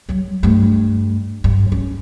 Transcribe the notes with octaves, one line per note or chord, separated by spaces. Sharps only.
F#3 G3
G2 A3
G2
C#4